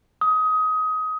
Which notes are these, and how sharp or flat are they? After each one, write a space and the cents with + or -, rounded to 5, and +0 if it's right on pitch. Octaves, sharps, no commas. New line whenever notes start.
D#6 +20